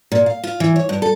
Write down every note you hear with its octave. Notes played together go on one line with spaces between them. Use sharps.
A#2
F5
F4
E3
C#5
G2
A4